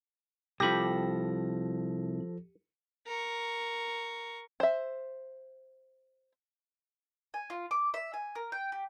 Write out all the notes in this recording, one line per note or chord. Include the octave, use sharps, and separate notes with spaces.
C2 F3 G4 A4 B5 A#6
A#4 C#6
C5 E5
G#5
F4
D6
E5
G#5
A#4
G5
G4